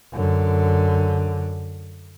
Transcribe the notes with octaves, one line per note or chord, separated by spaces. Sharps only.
F#2 D3